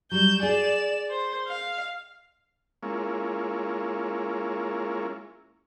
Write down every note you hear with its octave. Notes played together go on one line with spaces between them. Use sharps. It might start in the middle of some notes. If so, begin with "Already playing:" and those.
F#3 G3 G6 E7
G#4 D5 E7
C5
F5
G#3 A#3 C#4 E4 F4